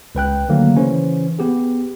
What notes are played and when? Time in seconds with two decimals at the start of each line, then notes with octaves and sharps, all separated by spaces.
0.15 C#2 B4 G5 F#6
0.49 D3 D#3 F#3 A3 A#3
0.75 C#3 E3 C#4 C5
1.39 B3 G4 G#4